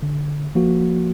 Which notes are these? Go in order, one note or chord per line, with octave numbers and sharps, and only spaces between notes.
D3
F3 A#3 F#4